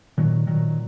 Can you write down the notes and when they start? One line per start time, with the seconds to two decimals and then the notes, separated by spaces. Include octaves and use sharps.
0.18 A#2 D#3 F#3
0.47 A#2 D#3 F#3